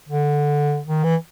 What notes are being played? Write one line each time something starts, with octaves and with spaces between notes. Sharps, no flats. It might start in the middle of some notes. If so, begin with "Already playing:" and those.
D3
D#3
E3